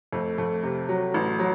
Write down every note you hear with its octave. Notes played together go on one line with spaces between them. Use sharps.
F2 A3
F2 A3
C3
F#3
A1
F#3